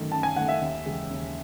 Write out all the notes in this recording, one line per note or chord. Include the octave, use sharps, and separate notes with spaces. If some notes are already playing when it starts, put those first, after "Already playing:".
Already playing: F#2 D#3 A3
F#2 A5
G#5
D#3 A3 F#5
E5
D#2
C#3 E3 G#3
D#2